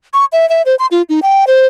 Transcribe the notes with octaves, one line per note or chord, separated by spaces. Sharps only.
C#6
E5
E5
C5
C6
F4
D#4
G5
C5